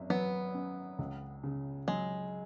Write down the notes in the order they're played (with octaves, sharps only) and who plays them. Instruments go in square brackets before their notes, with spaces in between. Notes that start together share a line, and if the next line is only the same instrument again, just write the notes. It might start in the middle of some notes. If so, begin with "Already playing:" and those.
Already playing: [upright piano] G#1 F#2
[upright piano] F#3 [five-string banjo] B3
[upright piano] C#4
C#2
C#3
[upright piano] F#3 [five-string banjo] G#3